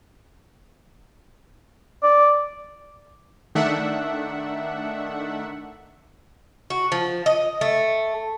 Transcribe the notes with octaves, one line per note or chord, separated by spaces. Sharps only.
D5
D#3 A3 D4 E5 F#5
F#4
F3
D#5
A3